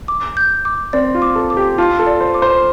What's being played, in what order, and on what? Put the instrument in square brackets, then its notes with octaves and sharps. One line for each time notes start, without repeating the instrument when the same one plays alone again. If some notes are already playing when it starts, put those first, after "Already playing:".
[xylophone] D6
G6
D6
[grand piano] C4 [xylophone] D5
[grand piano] F4
[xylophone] D6
[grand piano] A4
[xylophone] D6
[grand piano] G4
[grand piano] F4 [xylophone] A5
[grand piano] A4
[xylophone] D5
[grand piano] C5
[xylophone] D6
[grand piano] C5